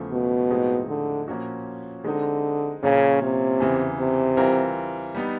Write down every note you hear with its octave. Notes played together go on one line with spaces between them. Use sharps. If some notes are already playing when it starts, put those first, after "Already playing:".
Already playing: E2 C#3 F3 A3
B2
A2 F3 G#3 C4 D#4
D3
A#2 F3 A#3 C#4 F#4
D3 G#3 C4 D#4
A#2 C#3 F3 A#3 C#4
C3
E2 C#3 E3
C3
E3 G3 C4 F4 A#4
G3 B3 D#4